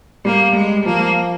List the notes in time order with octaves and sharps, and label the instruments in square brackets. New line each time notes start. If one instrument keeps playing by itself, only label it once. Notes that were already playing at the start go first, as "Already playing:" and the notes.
[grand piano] G3 [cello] A#3
[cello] G#3
[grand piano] F3 [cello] A#3